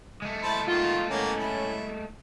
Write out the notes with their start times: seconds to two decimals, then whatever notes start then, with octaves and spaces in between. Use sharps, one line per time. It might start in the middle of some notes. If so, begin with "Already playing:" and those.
0.22 G#3 A3
0.43 E4 C5 A5
0.67 D#3 F4 F#4
1.11 A2 A#3 B3 C#4
1.39 E4